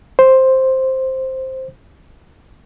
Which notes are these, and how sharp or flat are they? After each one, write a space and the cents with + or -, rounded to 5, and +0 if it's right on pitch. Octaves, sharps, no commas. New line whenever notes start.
C5 +5